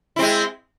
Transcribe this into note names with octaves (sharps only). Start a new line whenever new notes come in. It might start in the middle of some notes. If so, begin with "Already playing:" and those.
G#3 C4 E4